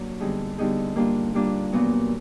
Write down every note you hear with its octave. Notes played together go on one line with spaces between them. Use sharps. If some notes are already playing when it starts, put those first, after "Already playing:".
Already playing: F#3 A#3 D4
D3 G3 B3 D#4 G#4
D3 G3 B3 D#4 G#4
G3 A#3 D4 F4
G3 A#3 D4 F4
A#2 F#3 B3